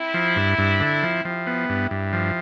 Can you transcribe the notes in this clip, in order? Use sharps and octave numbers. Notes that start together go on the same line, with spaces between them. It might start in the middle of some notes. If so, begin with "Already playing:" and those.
Already playing: C4 E4
F3
G2
G2
D3
F3
F3 E4 G4
B3
G2
G2
F3